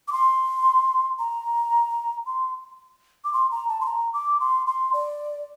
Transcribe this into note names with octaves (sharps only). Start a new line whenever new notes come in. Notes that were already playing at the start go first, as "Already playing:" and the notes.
D6
C6
A#5
C6
D6
C6
A#5
A5
C6
A#5
D6
C6
C6
D5